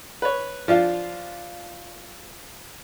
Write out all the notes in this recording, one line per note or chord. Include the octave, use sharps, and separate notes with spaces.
B4 C#5
F3 D4 F4